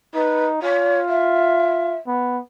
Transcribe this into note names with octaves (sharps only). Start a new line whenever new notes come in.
D#4 B4
F4 C#5
E5
B3